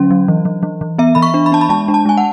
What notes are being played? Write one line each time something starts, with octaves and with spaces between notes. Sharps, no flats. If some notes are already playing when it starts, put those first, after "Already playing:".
Already playing: D3 F#3 C#4
F#3
E3
E3
E3
E3
B3 E5
E3 B5
C#6
D4
B5
D4 A5
B5
G#3 A5
D4
A5
G#3 G#5
F#5